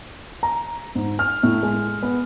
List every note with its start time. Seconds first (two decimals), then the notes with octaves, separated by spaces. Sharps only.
0.43 A#5
0.95 G#2
1.19 F6
1.43 A2
1.63 G#3
2.03 B3